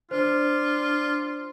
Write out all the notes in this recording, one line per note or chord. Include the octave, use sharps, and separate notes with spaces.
D4 F4 C5